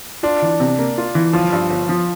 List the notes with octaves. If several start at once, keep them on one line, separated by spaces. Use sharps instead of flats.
D4 F4
E3
C3
A#3
F4
E3
G1 F3 F4
G2
G1
F3